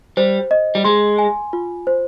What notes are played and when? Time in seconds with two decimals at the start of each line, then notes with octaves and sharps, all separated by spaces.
0.17 G3 C5
0.51 D#5
0.75 G3
0.85 G#3 C6
1.18 G#5
1.53 F4
1.87 C5